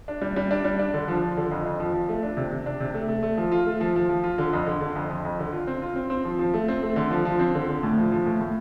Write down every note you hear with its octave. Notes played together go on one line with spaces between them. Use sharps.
D4
G3
G3
D4
G3
D4
D3
F3
F3
D3
F2
F2
F3
F3
A3
D4
C3
C3
D4
C3
A3
A3
A3
F3
F4
A3
F3
F3
F3
F4
D3
F2
D3
D3
F2
F2
F2
D3
F4
C4
F4
C4
C4
F3
F3
A3
C4
A3
D3
F3
F3
C4
D3
D3
A2
F3
F3
A2
A2